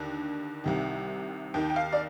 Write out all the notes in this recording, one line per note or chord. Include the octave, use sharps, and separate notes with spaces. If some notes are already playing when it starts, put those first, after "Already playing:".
Already playing: D#2 D3
C2 C3 D#3
D#2 D#3 G5
G5
F5
D5